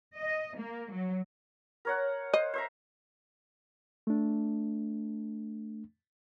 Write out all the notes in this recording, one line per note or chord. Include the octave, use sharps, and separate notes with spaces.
D#5
A#3
F#3
A#4 C#5 F#5
C5 D#5
C5 E5 A#5
A3 D4